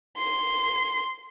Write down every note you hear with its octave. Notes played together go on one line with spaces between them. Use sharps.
C6 C7